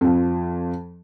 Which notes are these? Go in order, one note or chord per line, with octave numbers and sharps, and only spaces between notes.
F2 F3